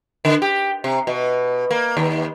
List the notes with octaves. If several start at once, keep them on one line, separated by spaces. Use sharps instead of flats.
D3
G4
C3
B2
A#3
D#2